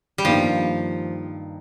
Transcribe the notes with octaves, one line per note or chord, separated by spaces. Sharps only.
G3
G2 D#3 F3 A#3